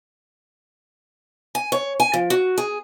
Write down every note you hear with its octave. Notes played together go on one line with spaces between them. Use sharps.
G#5
C#5
G#5
F3
F#4
G#4